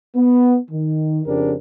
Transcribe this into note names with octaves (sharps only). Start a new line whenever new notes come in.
B3
D#3
F2 C#3 C4 D4 G4 A#4